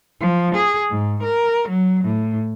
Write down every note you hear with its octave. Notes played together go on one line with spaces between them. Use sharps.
F3
G#4
G#2
A#4
F#3
A2